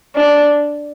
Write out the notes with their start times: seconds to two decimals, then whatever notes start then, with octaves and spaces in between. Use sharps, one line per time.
0.16 D4